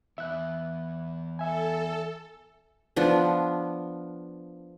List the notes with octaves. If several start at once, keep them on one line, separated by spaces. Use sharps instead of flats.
E2 E5 F#6
A4 E5 G#5
F3 B3 D4